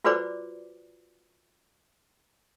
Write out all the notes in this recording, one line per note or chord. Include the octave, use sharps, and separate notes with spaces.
F4 F#4 B4 C5 D5 D6